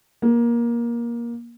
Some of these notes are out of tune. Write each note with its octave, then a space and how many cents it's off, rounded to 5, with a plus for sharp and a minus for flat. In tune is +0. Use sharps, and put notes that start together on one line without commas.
A#3 +20